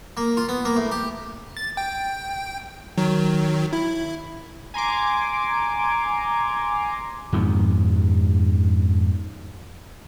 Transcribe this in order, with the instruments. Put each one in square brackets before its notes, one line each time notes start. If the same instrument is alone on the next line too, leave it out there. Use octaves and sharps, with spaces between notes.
[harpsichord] A#3
F4
B3
A#3
A2
G4
[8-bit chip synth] A6
G5
D#3 F#3
E4
[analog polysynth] G#5 A#5 C6 D6
[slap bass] F2 G#2 D#3 B3